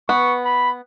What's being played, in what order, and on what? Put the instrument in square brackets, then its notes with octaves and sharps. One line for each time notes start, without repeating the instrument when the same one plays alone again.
[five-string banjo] B3 [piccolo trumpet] C#6
[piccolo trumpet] B5